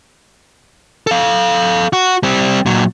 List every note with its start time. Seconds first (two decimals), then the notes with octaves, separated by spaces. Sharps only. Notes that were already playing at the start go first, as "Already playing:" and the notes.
1.07 A4 F5
1.93 F#4
2.23 G3 C4
2.66 A#2 F#3